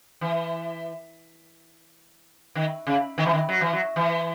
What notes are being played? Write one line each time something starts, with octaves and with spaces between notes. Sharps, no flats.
E3
D#3
C#3
D#3
E3
D#3
F#3
E3
F#3
E3